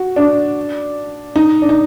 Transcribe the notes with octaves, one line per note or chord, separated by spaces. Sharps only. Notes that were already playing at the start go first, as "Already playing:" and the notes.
Already playing: F#4
D4
D#4
D4
D#4